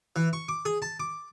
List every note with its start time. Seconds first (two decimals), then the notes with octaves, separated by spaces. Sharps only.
0.16 E3
0.33 C#6
0.49 D6
0.65 G#4
0.82 A5
1.00 D6